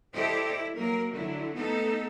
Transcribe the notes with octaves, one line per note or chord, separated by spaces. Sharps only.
E4 G4 A4 C5 D5 D#5
E4
F#3 A#3 A#4
D3 F#3 E4
A3 B3 D#4 A4